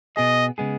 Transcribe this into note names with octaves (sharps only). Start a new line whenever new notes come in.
B2 B3 G#4 D#5
C#3 G#3 B3 G#4